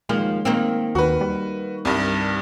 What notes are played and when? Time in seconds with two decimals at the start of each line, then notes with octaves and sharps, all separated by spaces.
0.09 D#2 F3 G#3 A#3
0.45 D#3 A#3 C4
0.95 D#2 F#4 B4
1.21 G3
1.85 C2 G2